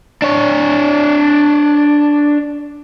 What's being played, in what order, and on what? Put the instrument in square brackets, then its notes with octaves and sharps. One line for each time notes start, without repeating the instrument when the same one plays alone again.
[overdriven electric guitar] D4 C#5